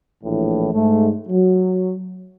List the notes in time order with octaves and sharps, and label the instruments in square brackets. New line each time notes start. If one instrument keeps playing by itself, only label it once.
[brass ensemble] A#1 A2 E3
G#2 A3
F#3